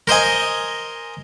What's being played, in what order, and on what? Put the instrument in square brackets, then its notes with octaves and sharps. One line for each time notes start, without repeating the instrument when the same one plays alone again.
[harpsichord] A#4 C5 D#5 G#5